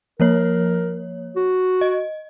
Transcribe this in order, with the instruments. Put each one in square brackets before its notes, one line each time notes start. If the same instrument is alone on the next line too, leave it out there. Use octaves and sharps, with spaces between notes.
[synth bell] F3 A#3 C#5 [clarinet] A#4
[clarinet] F#4
[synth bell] D#5